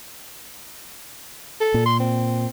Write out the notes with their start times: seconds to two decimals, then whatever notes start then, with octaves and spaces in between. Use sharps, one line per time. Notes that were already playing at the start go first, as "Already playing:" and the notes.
1.61 A4
1.74 A#2
1.86 C6
1.99 C4